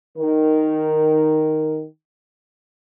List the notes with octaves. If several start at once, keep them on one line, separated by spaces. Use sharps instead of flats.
D#3 A#4